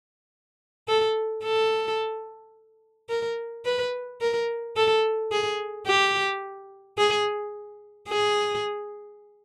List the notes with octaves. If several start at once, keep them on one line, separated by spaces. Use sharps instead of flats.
A4
A4
A#4
B4
A#4
A4
G#4
G4
G#4
G#4